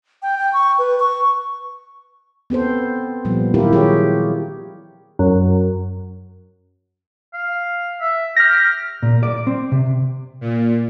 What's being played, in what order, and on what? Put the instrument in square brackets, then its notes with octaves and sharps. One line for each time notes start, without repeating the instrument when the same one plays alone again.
[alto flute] G5
G5
C#6
B4
C#6
[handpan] B3 C4 A4 C5
A#2 F3 G3 B3
D#3 F#3 E4 F4 G4 A#4
G4 G#4 C#5
[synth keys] F#2
[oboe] F5
E5
[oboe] G4 [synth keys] F6 A#6
[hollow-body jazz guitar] A#2
D5
C4
C3
[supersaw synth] A#2